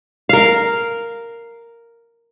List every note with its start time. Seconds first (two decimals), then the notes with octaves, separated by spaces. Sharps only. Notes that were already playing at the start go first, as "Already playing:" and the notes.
0.29 A#4 F5